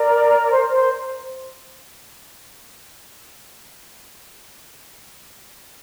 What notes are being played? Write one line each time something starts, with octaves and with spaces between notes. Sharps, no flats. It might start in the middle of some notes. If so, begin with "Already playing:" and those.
Already playing: A#4 D5
D5
C5
A#4
C5